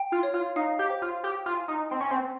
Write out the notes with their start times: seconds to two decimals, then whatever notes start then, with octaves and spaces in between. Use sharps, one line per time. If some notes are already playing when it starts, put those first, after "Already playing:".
Already playing: G5
0.12 F4
0.23 C#5
0.34 F4
0.56 D#4 F5
0.79 G4
0.90 C5
1.02 F4
1.24 G4 D#6
1.46 F4
1.57 G#5
1.68 D#4
1.90 C4 G5
2.00 C#4
2.11 C4